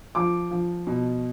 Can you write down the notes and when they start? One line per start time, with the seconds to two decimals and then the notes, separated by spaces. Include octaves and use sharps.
0.15 F3 D6
0.51 F3
0.87 B2